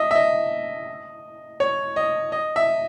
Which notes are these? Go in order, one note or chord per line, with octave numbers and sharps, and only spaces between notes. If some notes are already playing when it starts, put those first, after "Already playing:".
Already playing: D#5 E5
E5
D#5
C#5
D#5
D#5
E5